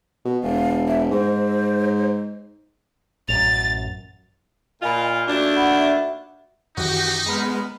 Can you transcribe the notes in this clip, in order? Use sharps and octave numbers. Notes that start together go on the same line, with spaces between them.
B2
E1 F5
E5
G#2 C5
A1 F#2 A6 F7
A#2 F4 D#5 G#5 B5
D#2 A3 D4 F#4
F#5 B5
E5
F#2 D#3 E3 D#4 F#4 G4
G#3 B3 A#5 B5 F6